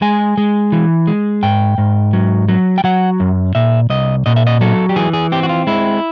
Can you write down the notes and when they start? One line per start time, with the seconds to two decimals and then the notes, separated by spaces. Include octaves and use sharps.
0.02 G#3 G#5
0.37 G#3
0.72 E3
1.07 G#3
1.43 G#2 G5
1.78 G#2
2.13 F#3
2.48 F#3
2.78 G5
2.84 F#3 F#5
3.20 F#2
3.55 A#2 E5
3.90 C2 D#5
4.26 A#2 D#5
4.36 E5
4.47 D#5
4.61 F#3 A4
4.89 G4
4.96 E3 G#4
5.13 G#4
5.32 C4 G4
5.43 F#4
5.49 F4
5.67 G#3 E4